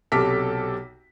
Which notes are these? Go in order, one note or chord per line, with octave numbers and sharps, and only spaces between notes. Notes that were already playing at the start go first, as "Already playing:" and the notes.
B1 C3 A4 D6 F6 B6